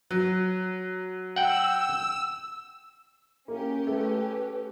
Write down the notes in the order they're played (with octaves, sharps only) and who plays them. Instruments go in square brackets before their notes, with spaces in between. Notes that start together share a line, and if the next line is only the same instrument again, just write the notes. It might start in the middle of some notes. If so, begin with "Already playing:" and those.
[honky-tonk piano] F#3
[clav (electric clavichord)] F#5 G5 [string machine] E6
[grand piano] A#3 [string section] C#4 G4
[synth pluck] A3 [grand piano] A4 [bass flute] B4